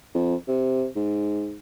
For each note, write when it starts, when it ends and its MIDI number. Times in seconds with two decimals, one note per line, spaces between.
0.14 0.35 41
0.48 0.87 48
0.96 1.58 44